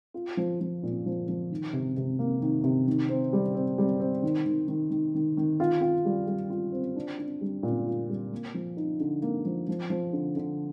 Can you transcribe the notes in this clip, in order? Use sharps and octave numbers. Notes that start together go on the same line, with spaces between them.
F4
F3
F3
A#2
F3
F3
D#3
C3
C3
A#3
D#3
C3
D#3
C4
G3
C4
G3
C4
D#3
D#3
D#3
D#3
D#3
D#3
F4
F4
G3
G3
F4
C4
D4
D4
G3
A#2
F4
G3
A#3
F3
D#4
D3
A#3
F3
F3
F3
D3
D3